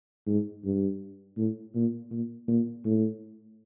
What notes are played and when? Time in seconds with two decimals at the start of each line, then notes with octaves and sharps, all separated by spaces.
0.27 G#2
0.65 G2
1.38 A2
1.75 A#2
2.11 A#2
2.48 A#2
2.85 A2